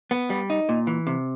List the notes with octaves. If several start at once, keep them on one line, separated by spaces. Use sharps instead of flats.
B3
G3
D#4
A#2
E3
C3